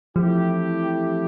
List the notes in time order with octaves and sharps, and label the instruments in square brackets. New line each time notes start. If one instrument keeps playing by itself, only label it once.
[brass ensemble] E3 A3 C4 E4 G4 [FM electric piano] F3